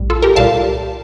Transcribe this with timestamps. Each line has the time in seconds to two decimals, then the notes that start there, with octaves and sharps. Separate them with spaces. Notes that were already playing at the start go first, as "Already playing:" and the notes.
Already playing: A#1 A2 G3
0.10 F4 A4
0.22 G4 A#4
0.36 C2 A#2 G3 F5 A5